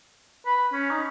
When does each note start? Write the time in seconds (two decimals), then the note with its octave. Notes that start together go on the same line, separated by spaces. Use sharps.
0.46 B4
0.73 C#4
0.91 D#4